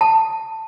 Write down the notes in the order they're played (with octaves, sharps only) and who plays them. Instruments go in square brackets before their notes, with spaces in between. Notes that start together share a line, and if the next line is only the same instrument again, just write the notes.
[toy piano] A5